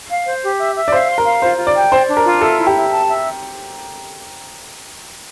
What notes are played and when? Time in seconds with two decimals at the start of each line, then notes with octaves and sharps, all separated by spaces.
0.10 F5
0.26 C5
0.43 G4
0.60 E5
0.76 E5
0.88 D5
0.92 C5 F5
1.09 C6
1.18 A#4
1.26 F5
1.42 F4 C5
1.59 F4
1.67 D5
1.75 G5
1.92 C5 D5
2.09 D4
2.17 A#4
2.25 F4
2.41 A4 E5
2.59 E4
2.67 G4
2.75 E5
2.91 A5
3.08 E5